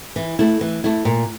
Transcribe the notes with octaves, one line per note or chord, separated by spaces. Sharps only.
E3
A3 E4
E3
A3 E4
A#2